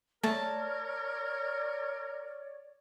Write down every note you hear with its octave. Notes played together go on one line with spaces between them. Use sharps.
A3 A#4 C#5 D5 A5